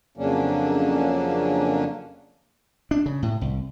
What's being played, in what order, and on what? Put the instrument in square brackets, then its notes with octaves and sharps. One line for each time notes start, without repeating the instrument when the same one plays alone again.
[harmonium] F2 C#3 F#3 A#3 C#4 D4
[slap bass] D4
C#3
A2
C2